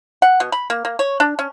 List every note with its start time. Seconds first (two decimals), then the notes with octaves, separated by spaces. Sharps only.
0.22 F#5
0.40 B2
0.52 B5
0.70 A#3
0.85 A#3
0.99 C#5
1.20 D4
1.39 C#4